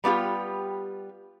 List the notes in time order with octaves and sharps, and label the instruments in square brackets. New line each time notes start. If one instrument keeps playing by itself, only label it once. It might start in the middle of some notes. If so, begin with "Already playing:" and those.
[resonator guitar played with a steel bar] G3 B3 F4 G4